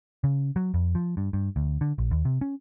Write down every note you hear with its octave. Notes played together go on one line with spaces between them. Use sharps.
C#3
F#3
F2
F3
G2
G2
D2
D3
A#1
D#2
C3
C#4